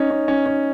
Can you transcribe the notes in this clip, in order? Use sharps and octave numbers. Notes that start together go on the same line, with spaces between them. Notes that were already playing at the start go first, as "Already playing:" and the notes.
Already playing: C#4 D#4
C#4
C#4
C#4